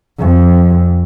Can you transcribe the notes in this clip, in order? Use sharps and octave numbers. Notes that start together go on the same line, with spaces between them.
F2